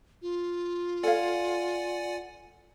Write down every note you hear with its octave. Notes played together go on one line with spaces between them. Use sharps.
F4
A4 C#5 D5 F5 F#5 G#5